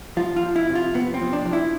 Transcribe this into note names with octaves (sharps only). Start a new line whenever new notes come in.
F3 F4
F4
F3
E4
C3
F4
C3 B3
C4
F3
D4
F3
E4